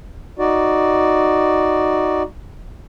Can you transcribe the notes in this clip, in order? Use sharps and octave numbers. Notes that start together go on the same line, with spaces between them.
D#4 F#4 D5